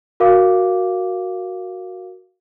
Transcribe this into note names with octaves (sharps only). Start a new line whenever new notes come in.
F#4 A#4 F5 D6